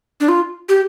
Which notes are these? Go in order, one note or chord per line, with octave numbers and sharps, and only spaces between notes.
D4
F4
G4